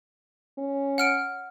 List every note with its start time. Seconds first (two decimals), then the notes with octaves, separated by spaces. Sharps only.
0.58 C#4
0.98 F#5 F6 D7